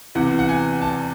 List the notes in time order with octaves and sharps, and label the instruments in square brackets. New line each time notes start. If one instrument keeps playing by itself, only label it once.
[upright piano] E2 C3 E3 [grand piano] F#5
[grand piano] F#5
G#5
A5